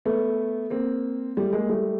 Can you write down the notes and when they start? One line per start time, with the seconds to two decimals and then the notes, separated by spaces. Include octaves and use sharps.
0.05 A3 B3
0.70 A#3 C4
1.37 G3 A3
1.53 G#3 A#3
1.69 G3 A3